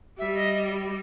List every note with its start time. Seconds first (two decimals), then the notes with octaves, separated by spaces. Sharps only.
0.19 G3 E5
0.35 D#5